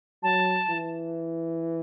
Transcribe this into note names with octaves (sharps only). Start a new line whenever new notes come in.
F#3 A5
E3